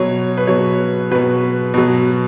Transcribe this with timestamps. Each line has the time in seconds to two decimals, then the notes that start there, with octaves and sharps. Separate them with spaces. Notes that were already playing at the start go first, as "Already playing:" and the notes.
Already playing: B2 F#3 C#5
0.37 B4
0.47 B2 F#3 C#5
1.11 B2 F#3 B4
1.74 B2 F#3